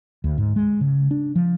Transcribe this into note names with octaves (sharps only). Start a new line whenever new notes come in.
D2
G#2
G#3
C#3
D4
F3